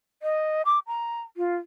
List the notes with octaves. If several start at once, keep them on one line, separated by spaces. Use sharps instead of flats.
D#5
D6
A#5
F4